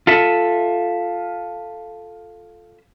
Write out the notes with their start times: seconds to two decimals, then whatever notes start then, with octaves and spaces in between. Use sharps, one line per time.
0.07 F4 A4 E5